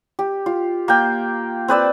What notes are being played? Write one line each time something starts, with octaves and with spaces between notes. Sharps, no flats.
G4
F4
A#3 G5
C4 B4 D5 E6